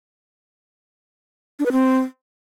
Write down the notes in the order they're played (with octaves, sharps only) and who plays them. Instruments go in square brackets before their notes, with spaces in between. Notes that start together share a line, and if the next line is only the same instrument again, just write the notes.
[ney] D4
B4
C4